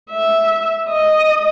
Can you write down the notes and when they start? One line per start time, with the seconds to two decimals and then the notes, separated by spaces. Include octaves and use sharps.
0.10 E5
0.90 D#5